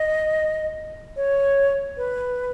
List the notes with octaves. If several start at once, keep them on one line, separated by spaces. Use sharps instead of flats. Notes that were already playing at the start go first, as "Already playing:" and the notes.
Already playing: D#5
C#5
B4